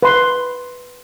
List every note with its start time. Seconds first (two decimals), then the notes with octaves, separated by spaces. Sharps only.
0.03 B4 C6